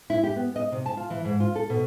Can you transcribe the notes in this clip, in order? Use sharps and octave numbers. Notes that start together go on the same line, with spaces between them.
E4
G4
B3
D#5
C3
A5
F4
E3
G#2
F4
A4
B2